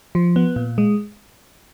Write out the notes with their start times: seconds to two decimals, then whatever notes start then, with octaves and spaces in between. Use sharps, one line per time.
0.15 F3
0.36 B3
0.56 A#2
0.78 G#3